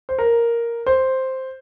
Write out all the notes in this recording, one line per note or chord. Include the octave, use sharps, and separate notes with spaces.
C5
A#4
C5